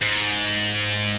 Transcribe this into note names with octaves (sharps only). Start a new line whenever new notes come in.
G#2